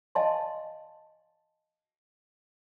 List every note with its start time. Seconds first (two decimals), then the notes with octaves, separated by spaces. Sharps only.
0.15 D#5 F5 G#5 A5 C6